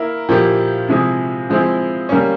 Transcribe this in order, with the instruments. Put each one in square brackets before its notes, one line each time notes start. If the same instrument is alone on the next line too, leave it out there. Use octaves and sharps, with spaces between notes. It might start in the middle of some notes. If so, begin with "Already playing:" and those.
Already playing: [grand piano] A#3 E4 A#4
A#2 F3 A#3 E4 G4
C3 F3 G#3 E4 G#4
F3 G#3 C4 E4
G3 A#3 C#4